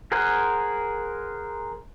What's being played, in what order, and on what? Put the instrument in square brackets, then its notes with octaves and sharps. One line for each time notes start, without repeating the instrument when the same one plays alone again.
[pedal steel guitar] G#4 A#4 C5 F#5 G#5